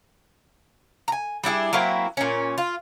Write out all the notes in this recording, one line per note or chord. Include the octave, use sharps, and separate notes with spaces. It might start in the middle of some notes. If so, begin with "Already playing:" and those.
G#5 A#5
G3 D4 E4 G#4
F#3 A#3 C4 E4
A#2 C#4
F4